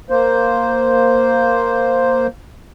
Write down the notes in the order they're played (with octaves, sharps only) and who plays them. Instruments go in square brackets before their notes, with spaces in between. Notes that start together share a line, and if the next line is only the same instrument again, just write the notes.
[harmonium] A#3 C5